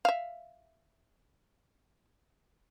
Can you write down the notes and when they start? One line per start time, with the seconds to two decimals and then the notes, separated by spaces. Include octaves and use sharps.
0.05 E5 F5